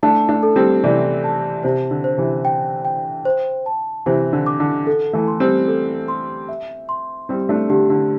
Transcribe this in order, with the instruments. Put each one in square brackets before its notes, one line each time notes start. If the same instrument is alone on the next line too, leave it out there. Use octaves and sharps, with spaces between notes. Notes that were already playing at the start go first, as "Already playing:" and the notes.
[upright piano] A3 D4 [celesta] A5
[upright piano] A3 D4
[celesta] A4
[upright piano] G3 C4
[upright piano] C3 E3 [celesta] D5
[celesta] A5
[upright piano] C3 [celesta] C5
[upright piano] D3
[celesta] C5
[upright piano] C3 E3
[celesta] G5
G5
C5
A5
[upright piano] C3 E3 [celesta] C5
[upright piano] D3
[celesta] D6
[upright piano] D3
[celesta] A4
[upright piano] E3 A3
[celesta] C6
[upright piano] G3 C4
[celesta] A4
C6
E5
C6
[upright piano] G3 C4 [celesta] G4
[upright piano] A3 D4
[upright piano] D3 [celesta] G4
[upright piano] D3